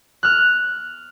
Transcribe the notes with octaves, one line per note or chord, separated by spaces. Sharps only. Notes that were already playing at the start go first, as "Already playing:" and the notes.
F6 F#6